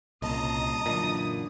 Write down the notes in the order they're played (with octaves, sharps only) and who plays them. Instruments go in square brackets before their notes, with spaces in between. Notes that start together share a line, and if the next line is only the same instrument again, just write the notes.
[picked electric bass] C2 [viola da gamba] A#2 C#3 [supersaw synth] D#5 A5 A#5 [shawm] D#6
[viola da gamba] F#2 D3 E3 [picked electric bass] A#2